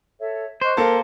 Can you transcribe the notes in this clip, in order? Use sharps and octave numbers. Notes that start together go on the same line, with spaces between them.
A4 C#5 E5
C5 D#5 C#6 F#6
A#3 G4 A4 A#4 A5